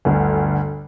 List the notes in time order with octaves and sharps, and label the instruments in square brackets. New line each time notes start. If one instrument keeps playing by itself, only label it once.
[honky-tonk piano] G1 D2